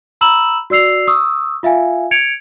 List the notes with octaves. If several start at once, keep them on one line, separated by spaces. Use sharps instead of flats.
A#5 B5 E6 E7 F#7
F#4 D5 E6 C7 F7
C#6 D#6 E6
F4 E5 F5 G#5
G#6 C#7 D7 F7